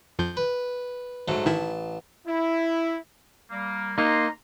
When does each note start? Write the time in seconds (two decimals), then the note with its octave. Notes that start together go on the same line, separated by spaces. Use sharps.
0.19 F2 F3 G6
0.37 B4
1.28 G#2 F#3 A3
1.46 A1 D#3 E4 A5
2.27 E4
3.51 G3 A#3
3.98 A#3 D#4 A#5 C6